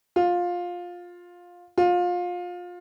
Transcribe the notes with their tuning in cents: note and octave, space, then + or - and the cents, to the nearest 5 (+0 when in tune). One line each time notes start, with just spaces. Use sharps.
F4 +15
F4 +25